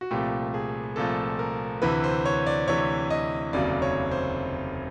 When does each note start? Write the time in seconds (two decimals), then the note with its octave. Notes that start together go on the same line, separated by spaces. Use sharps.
0.01 F#4
0.11 C2 A#2 F3 A3 G4
0.54 G#4
0.96 C2 A#2 F3 A3 A4
1.39 A#4
1.82 D2 C3 E3 B4
2.04 C5
2.26 C#5
2.46 D5
2.68 D2 C3 E3 C#5
3.10 D#5
3.53 F1 D#2 C#3 F#3 D5
3.82 C#5
4.11 C5